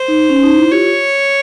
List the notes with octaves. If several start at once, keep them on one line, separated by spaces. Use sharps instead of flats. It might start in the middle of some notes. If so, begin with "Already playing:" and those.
Already playing: C5
D#4
C#4
D#4
E4
F4 G4 C#5